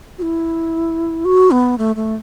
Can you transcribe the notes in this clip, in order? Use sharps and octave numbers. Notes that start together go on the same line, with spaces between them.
F#4
E4
F#4
B3
A3
A3